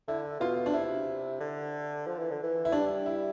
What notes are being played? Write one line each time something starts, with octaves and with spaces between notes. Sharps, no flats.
D3 E4
B2 F4
D4
C3 E4
D3
F3
E3
D3
E3
E4
G3 D4
E4